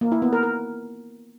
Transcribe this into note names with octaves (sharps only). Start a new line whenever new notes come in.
A#3
E4
B3
A#4
A#4